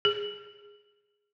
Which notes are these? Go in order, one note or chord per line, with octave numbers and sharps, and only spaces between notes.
G#4